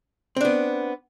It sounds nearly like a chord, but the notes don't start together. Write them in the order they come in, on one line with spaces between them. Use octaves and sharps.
C4 D4 B3